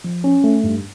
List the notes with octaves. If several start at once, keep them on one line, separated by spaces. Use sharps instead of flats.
F3
C#4
A3
G2